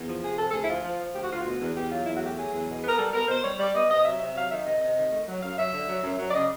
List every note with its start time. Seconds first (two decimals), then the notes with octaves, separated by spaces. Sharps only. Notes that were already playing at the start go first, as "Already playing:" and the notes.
Already playing: E2
0.08 F3
0.23 C3 G#4
0.39 F3 A4
0.49 A4
0.53 D2 G#4
0.64 E4
0.69 F3 F4
0.84 F3
0.99 F3
1.15 D2 G4
1.23 F#4
1.31 D2 F4
1.40 B2 F#4
1.61 E2
1.76 E2 G4
1.91 F#3 F4
2.06 E2 E4
2.17 F#4
2.22 A3 G4
2.36 F#3 G#4
2.53 E2
2.68 B2
2.83 B3
2.89 A#4
2.98 G3 A4
3.13 B3 A#4
3.28 B2 C5
3.43 G3 C#5
3.59 G3 D5
3.75 B3 D#5
3.89 C3 D#5
4.05 F#3 E5
4.20 C3 E5
4.35 F#3 F5
4.50 D#3 E5
4.66 C3 D#5
4.81 C3 D#5
4.96 D#3
5.12 A3
5.28 F#3
5.43 F#2 F5
5.58 F#3 E5
5.73 D3
5.89 F#3
6.04 F#2
6.19 F#3
6.29 D5
6.34 C#3 D#5